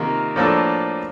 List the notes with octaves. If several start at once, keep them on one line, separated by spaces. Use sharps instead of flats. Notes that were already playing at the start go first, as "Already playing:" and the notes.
Already playing: C3 D#3 A#3 F4 A#4
A2 F3 A#3 D4 A4